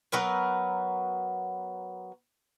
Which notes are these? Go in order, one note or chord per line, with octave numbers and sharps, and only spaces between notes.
F#3 B3 A#4 B4